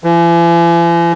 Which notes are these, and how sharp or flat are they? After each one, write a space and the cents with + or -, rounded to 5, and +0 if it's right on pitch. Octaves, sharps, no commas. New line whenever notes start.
E3 +45